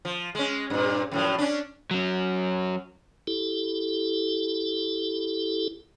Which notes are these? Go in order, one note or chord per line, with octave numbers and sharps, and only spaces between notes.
F3
G#3 C#4
G2 A#2
F#2 A2 F3
C#4 D4
F#3 C#4
E4 G4 A4